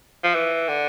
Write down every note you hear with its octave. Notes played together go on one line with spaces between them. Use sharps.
F3
E3
D3